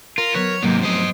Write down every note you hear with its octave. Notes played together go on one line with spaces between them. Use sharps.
F4 A#4
F#3 B3 B4 C#5
G#2 C3 F#3 A#3
F3 A3 C4 C5 D#5